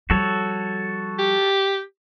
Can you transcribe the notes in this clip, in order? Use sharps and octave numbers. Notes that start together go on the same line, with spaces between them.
F3 G3 F#4 A4 C#5
G4